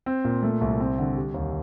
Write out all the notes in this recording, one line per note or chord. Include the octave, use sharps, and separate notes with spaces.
C4
A#2
A3
C2
C4
D3
G3
D#2